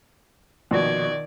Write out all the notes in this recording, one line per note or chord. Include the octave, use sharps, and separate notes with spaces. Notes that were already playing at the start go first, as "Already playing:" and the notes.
A#1 B2 D#3 D5 G#6